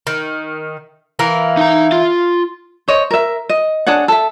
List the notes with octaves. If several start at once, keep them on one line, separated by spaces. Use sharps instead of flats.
D#3
E3 A#4 F5
D#4 A#5
F4
C5 C#5 D#5
A#4 E5
D#5
D4 G#4 C#5 F#5
A4 E5